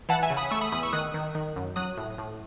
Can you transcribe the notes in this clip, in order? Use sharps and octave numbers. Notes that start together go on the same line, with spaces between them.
E3 F#5 A5
E5 G#5
C#3
B5 D#6
A3 C#6 E6
B5 D#6
E2 B5 D#6
C#6 E6
D#3 D#6 F#6
D#3
D#3
F#2
F#3 D#6 F#6
A2
A2